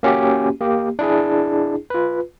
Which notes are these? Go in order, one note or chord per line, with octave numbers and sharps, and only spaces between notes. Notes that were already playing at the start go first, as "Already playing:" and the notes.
A#3 C#4 F#4 G4
A#3 G4
D4 E4 G#4
F4 B4